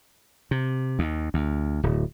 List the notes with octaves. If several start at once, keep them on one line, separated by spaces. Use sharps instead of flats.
C3
D#2
D2
D1